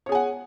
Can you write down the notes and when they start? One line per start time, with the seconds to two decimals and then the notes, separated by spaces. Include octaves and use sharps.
0.06 C#5
0.09 G#4
0.12 G#5
0.15 F#5